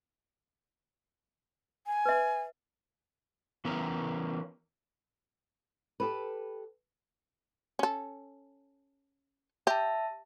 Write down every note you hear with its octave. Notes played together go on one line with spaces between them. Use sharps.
G#5
B4 E5
E3 B3 C#4 A#4
G4 A4 B4
C#4 A4
G4 E5 A5